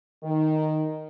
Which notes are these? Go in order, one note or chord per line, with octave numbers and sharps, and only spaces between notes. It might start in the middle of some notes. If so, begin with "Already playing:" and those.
D#3